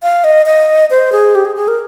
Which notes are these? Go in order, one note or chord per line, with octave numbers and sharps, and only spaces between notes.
F5
D#5
D#5
C5
G#4
G4
G#4
G#4
A#4